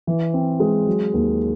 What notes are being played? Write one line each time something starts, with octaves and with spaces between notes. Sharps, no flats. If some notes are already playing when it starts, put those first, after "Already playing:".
E3
C4
G#3
F#3
D#2